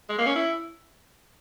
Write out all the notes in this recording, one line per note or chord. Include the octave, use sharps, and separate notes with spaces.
G#3
A#3
C#4
E4